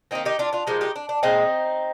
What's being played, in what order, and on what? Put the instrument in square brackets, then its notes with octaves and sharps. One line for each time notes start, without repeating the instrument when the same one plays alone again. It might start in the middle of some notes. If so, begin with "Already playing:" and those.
[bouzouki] D#3 A#3 C4 D#4
D#4 G4
D4 F4
D4 F4
A#2 F3 G#3 D#4 G4
D#4 G4
D4
D4
A#2 G#3 C4 D#4